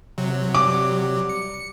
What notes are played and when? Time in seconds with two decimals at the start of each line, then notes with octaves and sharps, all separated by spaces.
0.18 C3 F#3
0.55 G3 D6
1.29 C#7